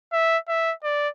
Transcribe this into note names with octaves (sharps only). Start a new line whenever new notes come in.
E5
E5
D5